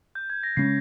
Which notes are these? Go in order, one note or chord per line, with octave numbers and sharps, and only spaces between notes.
G6
G#6
A#6
C#3 G#3 C#4 C7